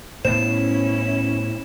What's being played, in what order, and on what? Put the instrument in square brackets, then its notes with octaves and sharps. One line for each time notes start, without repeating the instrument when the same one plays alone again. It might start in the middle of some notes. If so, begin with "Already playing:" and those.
[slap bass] A2 B3 [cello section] C#4 E4 [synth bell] C5 [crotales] E7